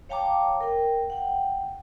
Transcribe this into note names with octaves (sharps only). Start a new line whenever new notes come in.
C#5 F5 G5 A5 A#5 D6
A#4 G5
F#5 G5